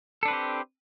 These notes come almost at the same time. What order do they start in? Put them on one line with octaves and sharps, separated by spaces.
A4 D4 B4 C4 G4